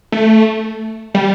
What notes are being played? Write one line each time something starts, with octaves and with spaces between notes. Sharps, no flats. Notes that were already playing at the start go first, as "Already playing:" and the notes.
A3
G3